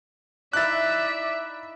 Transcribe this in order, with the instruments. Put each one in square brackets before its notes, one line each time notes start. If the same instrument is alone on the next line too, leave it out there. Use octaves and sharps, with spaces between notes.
[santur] D#4 E4 F5 [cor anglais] D5 [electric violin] E5 [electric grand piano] F#6 A6